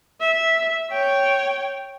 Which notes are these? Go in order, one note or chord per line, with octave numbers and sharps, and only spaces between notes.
E5
C#5 G5